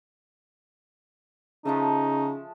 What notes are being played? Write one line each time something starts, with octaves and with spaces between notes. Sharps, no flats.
C#3 F3 G#3 A3 D#4